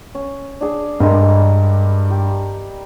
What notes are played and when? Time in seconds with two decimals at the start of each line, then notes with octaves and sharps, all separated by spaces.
0.15 C#4
0.61 D4 G#4
1.00 G2 G3 G#3 A#4
1.42 D#6
2.10 G4